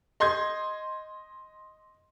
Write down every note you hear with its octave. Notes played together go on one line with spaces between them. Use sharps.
D#5 C6 G6 G#6